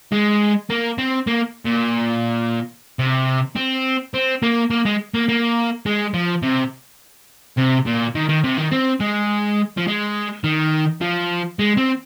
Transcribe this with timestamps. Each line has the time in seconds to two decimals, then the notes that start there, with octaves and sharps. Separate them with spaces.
0.12 G#3
0.70 A#3
0.98 C4
1.27 A#3
1.66 A#2
2.99 C3
3.56 C4
4.14 C4
4.43 A#3
4.70 A#3
4.85 G#3
5.14 A#3
5.29 A#3
5.86 G#3
6.14 F3
6.43 C3
7.57 C3
7.86 A#2
8.15 D#3
8.29 D#3
8.44 C3
8.57 D#3
8.71 C4
9.00 G#3
9.77 F3
9.87 G#3
10.44 D#3
11.01 F3
11.59 G#3
11.77 C4